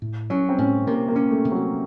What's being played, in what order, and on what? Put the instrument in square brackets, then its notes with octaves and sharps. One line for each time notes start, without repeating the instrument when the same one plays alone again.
[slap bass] A2
[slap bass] F#3 [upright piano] C#4
[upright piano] C4
[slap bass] A2 [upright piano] C#4
[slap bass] C3 [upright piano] A#3
[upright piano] A#3
[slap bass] C#4
[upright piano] A3
[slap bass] C3
[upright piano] F#3